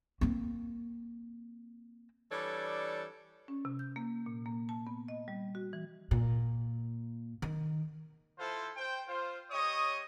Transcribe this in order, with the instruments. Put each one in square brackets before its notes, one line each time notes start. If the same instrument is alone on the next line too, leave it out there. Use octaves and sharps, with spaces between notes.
[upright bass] A#3 C4
[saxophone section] E3 G3 D4 A4 C#5 D5
[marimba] C#4
C3
G6
A#3
A#2
A#3
A5
B3
D#5
G3
F#4
E3
[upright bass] A#2
D#3
[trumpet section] E4 F4 A4 C5
C5 G5
F4 C5
G3 C#5 D#5 C#6 D#6